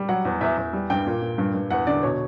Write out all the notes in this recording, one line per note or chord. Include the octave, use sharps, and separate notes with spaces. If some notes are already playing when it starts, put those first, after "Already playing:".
Already playing: G3
F#3 F#5
E2
E2 E5
E2
G3
G2 G5
A#2
A#2
G2
G2
E2 F#5
D3 D5
B2 C#5